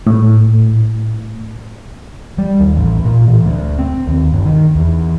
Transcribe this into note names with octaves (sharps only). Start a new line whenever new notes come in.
A2
G3
D#2
A1
A#2
A1
D2
C4
D#2
G1
D#3
E2